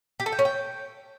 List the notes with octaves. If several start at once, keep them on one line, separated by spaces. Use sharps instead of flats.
G4
A4
G5
C#4
G5